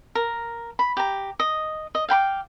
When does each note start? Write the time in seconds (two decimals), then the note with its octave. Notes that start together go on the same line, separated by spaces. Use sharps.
0.15 A#4
0.79 B5
0.97 G4 A#5
1.40 D#5
1.95 D#5
2.09 F5 G5 B5 D6